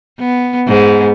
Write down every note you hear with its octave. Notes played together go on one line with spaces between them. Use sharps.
B3
G#2 G#3 B3